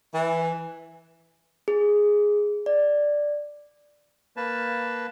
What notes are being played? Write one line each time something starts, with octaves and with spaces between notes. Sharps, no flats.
E3
G#4
D5
A#3 B4 A5